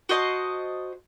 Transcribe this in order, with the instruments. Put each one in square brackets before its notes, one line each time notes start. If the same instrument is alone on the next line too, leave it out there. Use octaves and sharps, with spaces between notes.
[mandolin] F#4 C5 D#5 A5